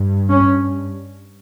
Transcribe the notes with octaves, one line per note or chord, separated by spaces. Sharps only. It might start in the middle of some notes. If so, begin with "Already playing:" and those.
Already playing: G2
C#4